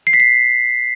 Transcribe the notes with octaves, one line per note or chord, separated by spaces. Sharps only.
C7
B6
C7